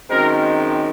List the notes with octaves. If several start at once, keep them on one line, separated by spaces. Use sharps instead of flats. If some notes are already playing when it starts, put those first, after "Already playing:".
F#2 D#3 G#3 C4 A#4